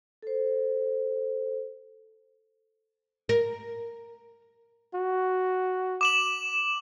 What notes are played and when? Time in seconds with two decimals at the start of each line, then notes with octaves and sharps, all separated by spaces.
0.23 A4 C5
3.29 A#4
4.94 F#4
6.01 D6 E7 F#7